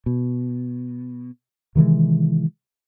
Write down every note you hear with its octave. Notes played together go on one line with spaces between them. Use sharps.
B2
C3 D#3 E3 G#3